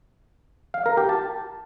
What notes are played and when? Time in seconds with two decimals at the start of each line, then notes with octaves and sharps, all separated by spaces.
0.74 F5
0.86 A#4
0.97 G4
1.09 A5